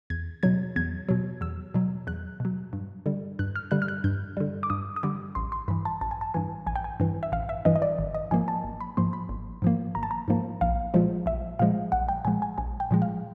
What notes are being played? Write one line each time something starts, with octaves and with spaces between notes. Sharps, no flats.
E2 G#6
B2 F#3 G#6
E2 G#6
B2 F#3
E2 E6
B2 F#3
E2 F#6
B2 F#3
G2
D3 G3
G2 F#6
F6
D3 G3 F#6
F6
F#6
G2 G6
D3 G3
D6
G2 D#6
D#6
D3 G3 D6
A1 C6
C6
G2 E3 B5
A5
A1 A5
G#5
A5
G2 E3 G#5
A1 G#5
G5
G#5
G2 E3
E5
A1 F5
E5
G2 E3 D#5
D#5
D5
G#1
D#5
G#2 F3 A#3 G#5
A5
G#1
B5
G#2 F3 A#3 C6
B5
G#1
G#2 F3 A#3
G#1 A#5
A5
A#5
G#2 F3 A#3
A#1 F5
A#2 F3 G#3
A#1 E5
A#2 F3 G#3 F5
A#1 F#5
G5
A#2 F3 G#3 G#5
G#5
A#1 G#5
G5
A#2 F3 G#3
F5